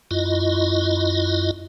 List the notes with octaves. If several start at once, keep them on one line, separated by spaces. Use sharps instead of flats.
F#2 E4 F4 D#5